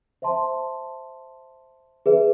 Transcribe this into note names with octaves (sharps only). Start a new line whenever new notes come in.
C5 E5 A5 C6
G#4 B4 E5